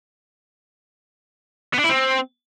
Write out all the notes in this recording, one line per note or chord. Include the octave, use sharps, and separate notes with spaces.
B3
D4
E4
C4